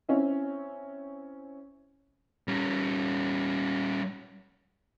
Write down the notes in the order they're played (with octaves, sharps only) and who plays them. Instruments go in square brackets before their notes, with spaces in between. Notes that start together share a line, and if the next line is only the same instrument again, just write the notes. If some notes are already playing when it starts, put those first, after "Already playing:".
[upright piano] C4 C#4 E4
[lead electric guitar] G3 C#4